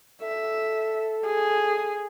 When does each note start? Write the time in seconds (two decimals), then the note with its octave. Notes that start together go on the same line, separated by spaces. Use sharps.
0.22 A4 E5
1.26 G#4